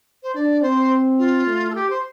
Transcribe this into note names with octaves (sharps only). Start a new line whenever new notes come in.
C5
D4 D5
C4 C5
F4
A3
A4
G4
C5